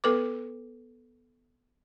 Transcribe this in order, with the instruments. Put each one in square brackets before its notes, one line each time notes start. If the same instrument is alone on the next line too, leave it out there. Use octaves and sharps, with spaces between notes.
[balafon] B3 A4 B4 D6